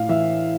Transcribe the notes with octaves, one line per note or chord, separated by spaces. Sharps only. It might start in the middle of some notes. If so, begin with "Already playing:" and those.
Already playing: A2 F5
E3 E5